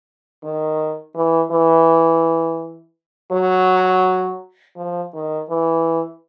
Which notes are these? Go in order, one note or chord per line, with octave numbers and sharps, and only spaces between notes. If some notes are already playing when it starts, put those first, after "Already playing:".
D#3
E3
E3
F#3
F3
D#3
E3